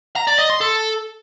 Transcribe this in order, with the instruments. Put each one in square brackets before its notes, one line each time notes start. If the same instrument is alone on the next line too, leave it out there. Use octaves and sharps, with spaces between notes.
[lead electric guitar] A#5
D5
D#5
C6
A4